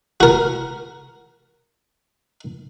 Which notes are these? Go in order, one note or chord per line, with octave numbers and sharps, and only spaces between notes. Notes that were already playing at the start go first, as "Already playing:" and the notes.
F#4 A#4